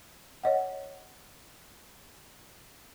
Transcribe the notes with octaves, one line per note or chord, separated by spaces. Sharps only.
C#5 D#5 F#5